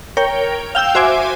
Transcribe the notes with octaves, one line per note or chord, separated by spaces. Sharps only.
A#4 C#5 G5
F5 G5 E6 G6
F#4 C5 E5 G#5 D6